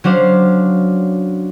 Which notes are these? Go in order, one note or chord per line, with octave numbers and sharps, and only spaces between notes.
F#3 C#4 D4 C5 F5